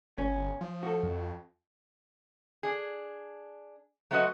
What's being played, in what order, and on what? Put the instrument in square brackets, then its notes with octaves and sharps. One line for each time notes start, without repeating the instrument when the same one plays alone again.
[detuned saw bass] G1 [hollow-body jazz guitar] C#4
[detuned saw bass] F3
[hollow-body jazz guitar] F#4 A4
[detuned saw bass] F2
[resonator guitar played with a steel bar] D4 G#4
F#3 A3 C4 F#4 B4 D#5